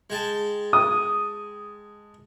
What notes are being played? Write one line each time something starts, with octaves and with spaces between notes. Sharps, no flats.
G#3 G5 A5
D#6